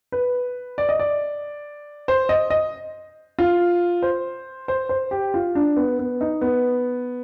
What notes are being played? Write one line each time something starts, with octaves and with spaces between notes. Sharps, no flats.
B4
D5
D#5
D5
C5
D#5
D#5
F4
C5
C5
C5
G4
F4
D4
B3
B3
D#4
B3